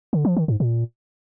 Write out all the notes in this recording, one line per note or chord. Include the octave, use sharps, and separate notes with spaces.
D3
F3
D#3
G#2
A#2